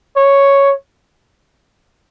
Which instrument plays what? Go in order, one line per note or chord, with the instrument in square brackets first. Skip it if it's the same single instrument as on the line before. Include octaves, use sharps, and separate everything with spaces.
[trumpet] C#5